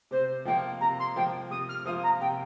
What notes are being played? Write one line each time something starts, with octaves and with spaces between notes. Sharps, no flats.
C3 C5
F3 A#3 F4 G5
C3 A#5
C6
F3 A#3 F4 G5
C3 D#6
F6
F3 A#3 F4 D#6
A#5
C3 G5